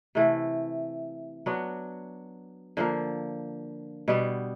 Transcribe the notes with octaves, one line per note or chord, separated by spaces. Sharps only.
C3 E3 A3
F#3 B3 D4 F#4
D3 F3 A#3
B2 G3 B3